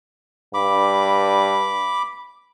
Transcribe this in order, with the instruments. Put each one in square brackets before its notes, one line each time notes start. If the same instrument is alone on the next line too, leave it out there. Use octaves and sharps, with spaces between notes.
[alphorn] G2 [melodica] B5 D6